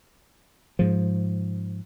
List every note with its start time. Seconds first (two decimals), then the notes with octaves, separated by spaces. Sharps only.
0.79 G#2 F3